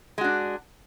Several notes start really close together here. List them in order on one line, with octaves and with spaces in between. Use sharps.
G#3 F#4 D4